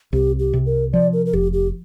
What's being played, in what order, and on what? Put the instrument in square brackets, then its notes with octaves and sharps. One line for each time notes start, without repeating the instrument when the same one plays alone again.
[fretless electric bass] C2 [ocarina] G4
[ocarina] G4
[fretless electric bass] C3
[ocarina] A#4
[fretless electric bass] F3 [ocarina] D5
[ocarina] A#4
A#4
[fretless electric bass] F1 [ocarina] G4
[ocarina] G4